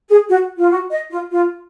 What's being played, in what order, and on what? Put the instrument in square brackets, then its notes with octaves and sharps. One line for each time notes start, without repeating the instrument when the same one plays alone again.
[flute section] G#4
F#4
F4
F#4
D#5
F4
F4